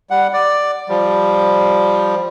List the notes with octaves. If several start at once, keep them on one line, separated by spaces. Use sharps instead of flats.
G3 F#5
D5
F3 G3